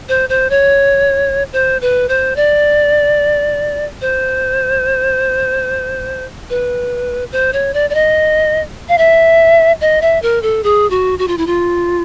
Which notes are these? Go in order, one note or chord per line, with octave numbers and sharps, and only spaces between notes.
C5
C5
C#5
C5
B4
C5
D5
C5
B4
C5
C#5
D5
D5
D#5
F5
E5
D#5
E5
A#4
A4
G#4
F#4
F#4
F4
E4
F4